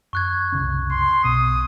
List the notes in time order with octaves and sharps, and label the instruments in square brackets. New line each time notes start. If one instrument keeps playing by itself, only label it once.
[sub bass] F#2 [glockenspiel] C#6 F#6 G#6
[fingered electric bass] C2 C#3 C#4
[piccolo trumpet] C6
[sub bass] B1 [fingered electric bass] B2 [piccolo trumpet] D#6